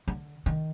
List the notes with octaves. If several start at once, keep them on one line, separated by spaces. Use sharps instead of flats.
D3
D#3